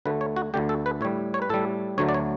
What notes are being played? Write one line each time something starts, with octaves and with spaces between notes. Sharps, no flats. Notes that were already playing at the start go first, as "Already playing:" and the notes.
D2 D3 A3 B4
C#5
F#4
D2 D3 A3 G4
A4
B4
A2 G3 C#5
C#5
B4
A2 G3 A4
D2 D3 F#3 A3 C#5
D5
C#5